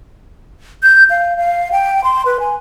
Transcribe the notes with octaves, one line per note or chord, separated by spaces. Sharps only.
G6
F5
F5
G5
C6
B4
G#5